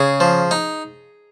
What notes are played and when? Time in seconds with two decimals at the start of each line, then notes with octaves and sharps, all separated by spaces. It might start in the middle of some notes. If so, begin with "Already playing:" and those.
Already playing: C#3 G#4
0.20 F3
0.51 D#4